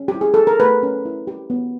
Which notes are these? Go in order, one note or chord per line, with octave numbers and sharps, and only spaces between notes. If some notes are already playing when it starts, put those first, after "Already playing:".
Already playing: C#4
G4
E4
G#4
G4 A4
A#4
A3 B4
C#4
E4
G4
B3